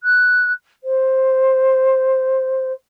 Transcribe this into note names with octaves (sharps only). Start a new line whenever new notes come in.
F#6
C5